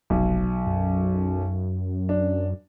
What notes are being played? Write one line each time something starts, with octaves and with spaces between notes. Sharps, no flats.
F1 B1
F#2
D4